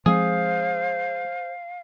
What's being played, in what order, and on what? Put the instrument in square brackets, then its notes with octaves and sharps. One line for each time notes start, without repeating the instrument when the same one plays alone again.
[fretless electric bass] F3 G#3 C4 [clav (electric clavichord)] G#4 [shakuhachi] C5 [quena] F5